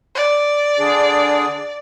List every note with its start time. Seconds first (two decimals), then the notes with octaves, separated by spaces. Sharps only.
0.15 D5
0.79 D3 D4 G#4